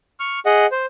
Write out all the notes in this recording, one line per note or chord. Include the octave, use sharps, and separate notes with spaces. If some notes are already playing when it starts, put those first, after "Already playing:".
C#6 F6
G#4 D#5 F#5
C5